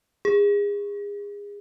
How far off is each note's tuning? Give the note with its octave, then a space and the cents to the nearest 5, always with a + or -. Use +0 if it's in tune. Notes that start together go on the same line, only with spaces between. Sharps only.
G#4 -30